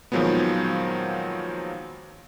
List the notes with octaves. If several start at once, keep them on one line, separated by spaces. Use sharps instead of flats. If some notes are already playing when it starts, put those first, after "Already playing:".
A#2 D#3 F3 F#3 G#3 B3